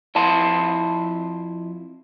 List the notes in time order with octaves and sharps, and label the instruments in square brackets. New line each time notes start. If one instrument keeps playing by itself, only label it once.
[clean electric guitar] F2 E4 A5 C6